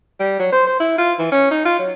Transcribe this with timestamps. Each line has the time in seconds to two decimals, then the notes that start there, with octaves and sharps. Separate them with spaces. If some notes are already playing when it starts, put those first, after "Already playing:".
0.19 G3
0.39 F#3
0.52 C5
0.67 C5
0.80 E4
0.98 F4
1.19 E3
1.32 C#4
1.51 D#4
1.65 F4
1.79 F#3